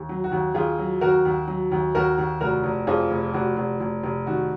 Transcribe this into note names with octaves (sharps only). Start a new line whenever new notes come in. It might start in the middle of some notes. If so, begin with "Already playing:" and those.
Already playing: D#2
F#3
F#4
D#2
D#2 F4 G#4
F#3
D#2 F#4 A#4
D#2
F#3
D#2
D#2 F#4 A#4
D#2
F1 F#4 A#4
F1
F2 F4 G#4
F1
F1 F#4
F1
F1
F1
D#3 F#4